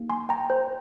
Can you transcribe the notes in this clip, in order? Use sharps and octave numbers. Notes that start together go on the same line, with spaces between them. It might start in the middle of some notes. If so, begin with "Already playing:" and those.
Already playing: A#3 D#4 G4
G#5 C6
G5 A#5
C5